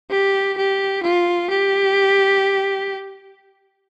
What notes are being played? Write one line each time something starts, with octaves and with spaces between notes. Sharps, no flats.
G4
G4
F4
G4